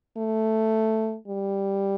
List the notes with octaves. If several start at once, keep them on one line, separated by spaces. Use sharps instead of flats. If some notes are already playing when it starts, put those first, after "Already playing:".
A3
G3